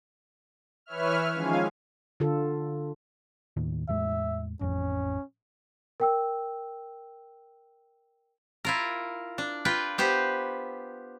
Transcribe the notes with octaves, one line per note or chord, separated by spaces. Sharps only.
E3 B4 C#5 E5 F6
D#3 F3 G#3 C#4 F5 G#5
D3 F4 A4
D#2 A2 D#3
E2 A2 G#3 E5
A1 F2 C#4
A#4 G5 E6
E4 F4 A#4
D4
F4 B4 G5
B3 G4 B4 C5